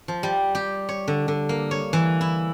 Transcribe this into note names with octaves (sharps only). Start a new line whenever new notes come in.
F3
G3
G4
C#5
D3
D3
A#3
C#5
E3
E4